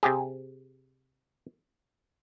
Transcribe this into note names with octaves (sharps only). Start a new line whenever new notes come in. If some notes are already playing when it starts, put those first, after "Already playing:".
C3 G4 G#4